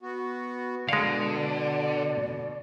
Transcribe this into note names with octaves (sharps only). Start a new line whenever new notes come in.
B3 F#4
B2 D3 G#3 D5 F5